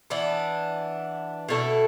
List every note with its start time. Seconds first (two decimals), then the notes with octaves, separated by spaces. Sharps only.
0.10 E3 B3 D4
1.49 B2 A3 E4 A4